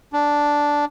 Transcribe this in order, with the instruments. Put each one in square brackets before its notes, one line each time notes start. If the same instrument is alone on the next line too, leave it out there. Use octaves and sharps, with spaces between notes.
[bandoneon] D4